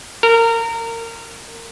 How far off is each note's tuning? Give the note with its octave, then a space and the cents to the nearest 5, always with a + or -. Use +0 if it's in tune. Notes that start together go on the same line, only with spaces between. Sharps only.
A#4 -25